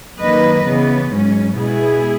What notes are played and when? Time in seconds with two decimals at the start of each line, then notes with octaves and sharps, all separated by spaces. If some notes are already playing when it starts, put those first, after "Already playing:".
0.20 F#2 D#3 A#3 B4 D#5
0.66 C#3 E3 B3
1.11 G#2 F#3 C#4
1.56 B2 G#3 B3 E4 G#4